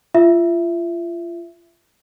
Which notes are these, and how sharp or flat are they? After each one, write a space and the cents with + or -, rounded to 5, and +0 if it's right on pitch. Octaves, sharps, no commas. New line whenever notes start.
F4 -30 E5 +10